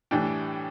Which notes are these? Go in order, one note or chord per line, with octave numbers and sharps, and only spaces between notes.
A2 E3 G3 D4 G5